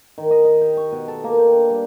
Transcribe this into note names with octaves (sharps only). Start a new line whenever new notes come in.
D#3
D#5
D#5
G4
C#6
B2
A4
A#3
G5
D4
G3